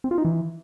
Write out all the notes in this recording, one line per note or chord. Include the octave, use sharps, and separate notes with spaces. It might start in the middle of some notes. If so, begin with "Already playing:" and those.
C4
F4
D#4
E3